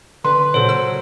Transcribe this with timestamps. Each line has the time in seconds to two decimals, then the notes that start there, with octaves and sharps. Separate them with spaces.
0.25 D3 B4 C6
0.54 A#2 C#3 F#3 A4 C5
0.69 E6